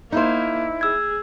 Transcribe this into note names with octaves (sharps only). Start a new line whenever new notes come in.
A#3 D#4 E4 C5
G#4 E6 G#6